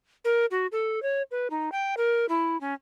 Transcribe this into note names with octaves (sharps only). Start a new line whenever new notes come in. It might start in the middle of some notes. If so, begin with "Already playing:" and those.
A#4
F#4
A4
C#5
B4
D#4
G5
A#4
E4
C#4